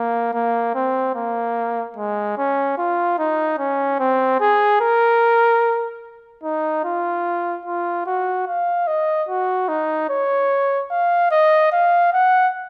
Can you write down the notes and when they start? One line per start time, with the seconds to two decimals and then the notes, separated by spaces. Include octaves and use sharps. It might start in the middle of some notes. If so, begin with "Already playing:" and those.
Already playing: A#3
0.34 A#3
0.75 C4
1.15 A#3
1.97 G#3
2.38 C#4
2.78 F4
3.19 D#4
3.59 C#4
4.00 C4
4.40 G#4
4.81 A#4
6.44 D#4
6.84 F4
7.65 F4
8.06 F#4
8.47 F5
8.87 D#5
9.29 F#4
9.69 D#4
10.10 C#5
10.91 F5
11.31 D#5
11.72 F5
12.13 F#5